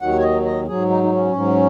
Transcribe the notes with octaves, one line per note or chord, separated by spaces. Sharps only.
D#2 D#3 F#3 F#5
C#5
D#5
D#5
G#2 F#3 G#4
D#4
D#4
C#4
G#2 F#3